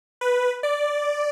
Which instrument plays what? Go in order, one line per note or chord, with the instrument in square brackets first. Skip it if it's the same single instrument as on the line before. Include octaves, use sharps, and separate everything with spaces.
[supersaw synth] B4
D5